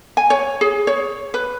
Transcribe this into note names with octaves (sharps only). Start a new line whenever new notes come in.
G#5
C#5
G#4
C#5
B4